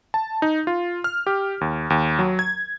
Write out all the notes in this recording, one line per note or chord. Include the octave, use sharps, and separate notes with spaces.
A5
D#4
F4
F6
G4
D#2
D#2
F#3
G#6